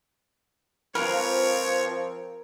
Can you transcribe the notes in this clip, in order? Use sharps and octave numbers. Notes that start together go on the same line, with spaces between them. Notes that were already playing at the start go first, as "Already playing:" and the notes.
F3 C4 F4 A#4 B4 C#5